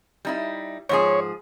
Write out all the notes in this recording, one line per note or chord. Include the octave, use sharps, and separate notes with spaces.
G3 D#4 E4
G#2 F3 G#4 C#5